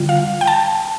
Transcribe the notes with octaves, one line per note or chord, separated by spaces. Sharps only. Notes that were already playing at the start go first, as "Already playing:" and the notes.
Already playing: D3 G3 F4
F5
G5
A5